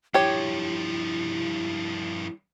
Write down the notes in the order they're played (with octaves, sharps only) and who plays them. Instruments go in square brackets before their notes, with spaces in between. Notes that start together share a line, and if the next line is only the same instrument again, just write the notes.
[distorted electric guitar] G2 F3 [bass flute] E4 [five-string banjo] G4 C#5